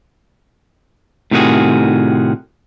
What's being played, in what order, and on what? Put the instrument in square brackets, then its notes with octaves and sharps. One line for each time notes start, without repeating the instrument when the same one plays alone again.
[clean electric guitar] A2 C3 D#3 C#4 F#4 G#4